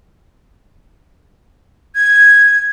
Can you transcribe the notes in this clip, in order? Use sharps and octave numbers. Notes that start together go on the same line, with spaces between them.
G#6